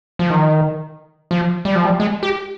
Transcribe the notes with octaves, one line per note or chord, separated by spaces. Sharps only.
F3
D#3
F3
G3
F3
G3
G#3
G4